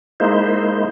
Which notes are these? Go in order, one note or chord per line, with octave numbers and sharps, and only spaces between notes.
G#3 A#3 D#4 E4 C5